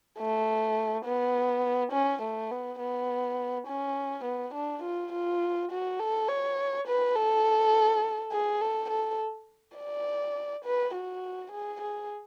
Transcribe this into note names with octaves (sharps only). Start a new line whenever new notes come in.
A3
B3
C#4
A3
B3
B3
C#4
B3
D4
F4
F4
F#4
A4
C#5
B4
A4
G#4
A4
A4
D5
B4
F#4
G#4
G#4